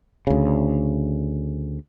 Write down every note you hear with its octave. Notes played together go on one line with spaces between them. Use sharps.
D2 C#3